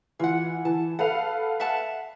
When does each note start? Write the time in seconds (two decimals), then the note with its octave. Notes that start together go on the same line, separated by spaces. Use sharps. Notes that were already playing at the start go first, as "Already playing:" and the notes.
0.19 E3 F4 F#5
0.65 E3 A5
0.99 A4 B4 F5 F#5
1.60 E5 F#5 A5